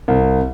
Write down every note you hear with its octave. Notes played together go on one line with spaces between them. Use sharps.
C2